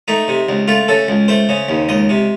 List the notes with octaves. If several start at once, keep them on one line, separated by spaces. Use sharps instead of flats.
A3 D#4
C3
C#2
A3 F4
C#3 A4
C#2
A3 C5
C#3
D#2
C#2 D#5
C3